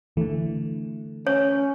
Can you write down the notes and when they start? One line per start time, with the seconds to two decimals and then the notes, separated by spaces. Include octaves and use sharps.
0.17 D3 E3 A3
1.27 C#4 C#5